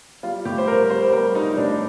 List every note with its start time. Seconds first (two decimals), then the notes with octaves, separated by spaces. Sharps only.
0.23 G3 F4
0.45 A2 G4
0.58 C5
0.68 G3 A#4
0.90 G3 C5
1.12 G3 A#4
1.35 G3 D#4
1.53 D#4
1.57 A2 D4